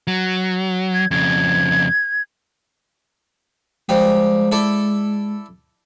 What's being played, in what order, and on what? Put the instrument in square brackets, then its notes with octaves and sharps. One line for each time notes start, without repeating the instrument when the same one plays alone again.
[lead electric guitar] F#3
[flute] G#6
[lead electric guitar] F2 C#3 [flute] G#6
[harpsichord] F3 G3 G4 [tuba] G#3
[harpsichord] E4 A4 D5